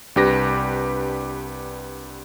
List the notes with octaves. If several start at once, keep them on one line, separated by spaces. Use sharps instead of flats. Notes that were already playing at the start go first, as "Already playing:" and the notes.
C2 D4 G4 B4 A#6